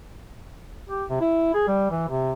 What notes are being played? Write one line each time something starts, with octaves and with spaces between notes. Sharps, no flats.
G4
C3
E4
G#4
G3
E3
C3